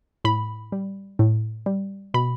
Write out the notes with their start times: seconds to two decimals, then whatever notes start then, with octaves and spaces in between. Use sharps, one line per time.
0.25 A2 B5
0.72 G3
1.19 A2
1.66 G3
2.14 B2 B5